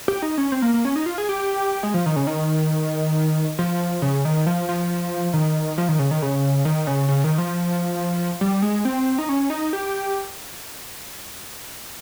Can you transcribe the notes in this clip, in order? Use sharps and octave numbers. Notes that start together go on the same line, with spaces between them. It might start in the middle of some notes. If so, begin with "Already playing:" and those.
G4
D#4
C#4
C4
A#3
A#3
C#4
D#4
F4
G#4
G4
G4
G#3
F3
D#3
C#3
D#3
F3
C#3
D#3
F3
F3
D#3
F3
D#3
C#3
D#3
C#3
D#3
C#3
C#3
D#3
F3
G3
G#3
C4
D#4
C#4
D#4
G4